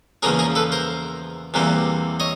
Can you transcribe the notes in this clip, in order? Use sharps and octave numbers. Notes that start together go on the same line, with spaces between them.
E2 C#3 F3 A#3 C#4 G#4 A#4
G#4 A#4
A4 B4
A#4 C5
E2 C3 E3 G3 A#3
C#5 D#5